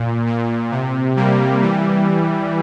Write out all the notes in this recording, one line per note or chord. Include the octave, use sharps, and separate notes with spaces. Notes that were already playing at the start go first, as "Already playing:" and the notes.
Already playing: A#2
A#2
C3
G3 A#3
E3 G3